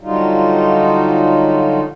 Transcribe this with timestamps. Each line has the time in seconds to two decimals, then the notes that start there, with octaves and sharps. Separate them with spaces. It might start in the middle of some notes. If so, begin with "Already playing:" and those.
0.01 D3 F#3 G3 D#4 F4